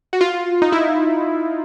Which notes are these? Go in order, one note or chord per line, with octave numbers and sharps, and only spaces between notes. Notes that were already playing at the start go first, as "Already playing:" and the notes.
F#4
F4
D#4
E4